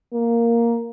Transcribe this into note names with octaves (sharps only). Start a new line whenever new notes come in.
A#3